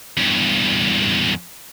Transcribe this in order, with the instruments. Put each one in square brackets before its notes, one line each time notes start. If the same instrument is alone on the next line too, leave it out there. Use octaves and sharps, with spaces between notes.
[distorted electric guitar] E2 G2